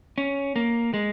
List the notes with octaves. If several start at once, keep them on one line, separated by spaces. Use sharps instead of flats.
C#4
A#3
G#3